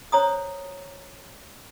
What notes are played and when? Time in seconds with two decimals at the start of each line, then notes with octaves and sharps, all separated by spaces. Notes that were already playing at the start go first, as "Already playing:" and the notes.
0.12 C5 C#5 A#5 D#6